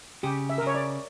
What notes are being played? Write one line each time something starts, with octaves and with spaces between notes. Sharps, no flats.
C#3 G4
E5
A#4
C#3 C#5
D5